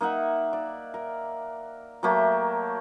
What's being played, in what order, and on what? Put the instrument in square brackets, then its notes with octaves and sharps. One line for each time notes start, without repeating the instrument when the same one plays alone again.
[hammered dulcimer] A#3 D#4 E5 F#5
D5
A#4
F#3 A3 A#3 G4